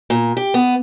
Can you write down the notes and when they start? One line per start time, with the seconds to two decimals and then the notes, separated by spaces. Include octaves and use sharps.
0.10 A#2
0.37 G4
0.54 B3